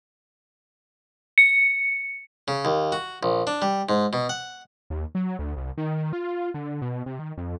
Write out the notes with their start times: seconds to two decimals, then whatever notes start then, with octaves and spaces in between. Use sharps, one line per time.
1.38 C#7
2.48 C#3
2.65 D#2
2.92 F#4
3.23 A#1
3.47 D4
3.62 G3
3.89 G#2
4.13 B2
4.29 F#5
4.90 D#2
5.15 F#3
5.39 D2
5.57 C2
5.78 D#3
6.13 F4
6.54 D3
6.82 B2
7.06 C3
7.19 D#3
7.38 F2